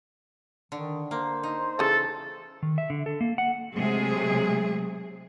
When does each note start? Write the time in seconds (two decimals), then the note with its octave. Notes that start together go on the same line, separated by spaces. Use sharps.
0.72 D3 D#3
1.11 A#3 C5
1.43 D#4
1.79 C#3 E3 A4
2.63 D#3
2.78 E5
2.90 D3
3.06 A4
3.21 A#3
3.38 F#5
3.74 C3 F#3 G#3 A3 G#4